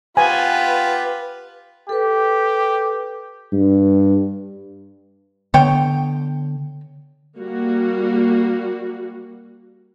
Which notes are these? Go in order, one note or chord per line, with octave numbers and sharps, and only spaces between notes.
B3 F4 G4 B4 G#5
G4 A4 B4
G2
D3 B3 C#5 G5
G3 A#3 F#4